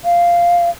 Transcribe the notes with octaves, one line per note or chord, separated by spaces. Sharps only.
F5